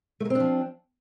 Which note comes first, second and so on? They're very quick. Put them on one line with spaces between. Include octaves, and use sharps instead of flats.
A3 A#3 C4 D4 F3